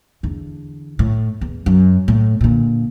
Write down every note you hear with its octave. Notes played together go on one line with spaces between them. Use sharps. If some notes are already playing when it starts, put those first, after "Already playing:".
E2 D3
A2
E2
F#2
A2
A#2 D3